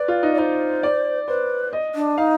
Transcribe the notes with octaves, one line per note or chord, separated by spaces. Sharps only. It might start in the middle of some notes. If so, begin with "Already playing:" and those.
Already playing: B4 D5
F4
D#4
D5
D#4 C5
D5
B4 C5
D#5
D4
D#4 F5